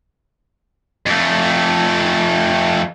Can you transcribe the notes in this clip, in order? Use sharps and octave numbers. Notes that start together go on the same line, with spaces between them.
F2 A3